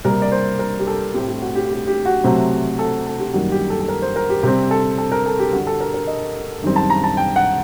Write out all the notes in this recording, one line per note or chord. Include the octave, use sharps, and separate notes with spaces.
C3 G3 A#3 A#4
D5
C5
A#4
G4
A4
A2 A3 C4 G4
G4
F#4
G4
G4
G4
F#4
C3 F#3 A3 C4
A4
A4
G4
F#2 D#3 G3 A#3 F#4
G4
A4
A4
A#4
C5
A#4
G4
C3 G3 C4 G4
A4
A4
A#4
A4
G4
G2 D3 G3 F#4
A4
A#4
A#4
D#5
F#2 D#3 G3 C4
A5
A#5
A5
G5
F#5